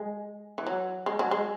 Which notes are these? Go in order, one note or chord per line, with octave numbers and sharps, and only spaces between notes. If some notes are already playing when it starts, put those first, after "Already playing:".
Already playing: G#3
E3
F#3
G#3
F#3
G#3